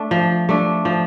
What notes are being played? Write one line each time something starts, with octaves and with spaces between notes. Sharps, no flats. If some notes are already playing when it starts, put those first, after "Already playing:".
Already playing: A3 D4
F3
A3 D4
F3